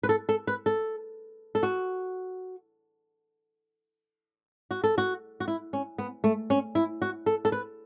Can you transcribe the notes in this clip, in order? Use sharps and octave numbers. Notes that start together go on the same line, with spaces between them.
B4
A4
A4
B4
A4
A4
F#4
F#4
A4
F#4
F#4
E4
C#4
B3
A3
C#4
E4
F#4
A4
A4
B4